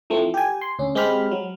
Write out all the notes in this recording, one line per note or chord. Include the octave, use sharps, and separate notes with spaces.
E3 F3 A3 C4
G4 G#5
C6
D2 C#4
G#3 C4 G4 B5 F6
F#3